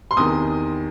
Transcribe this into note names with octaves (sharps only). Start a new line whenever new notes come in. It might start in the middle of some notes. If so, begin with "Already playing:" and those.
C6
E2 C3 D#3 D#6